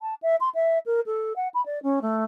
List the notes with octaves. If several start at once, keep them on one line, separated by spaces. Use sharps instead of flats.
A5
E5
C6
E5
A#4
A4
F#5
B5
D5
C#4
A3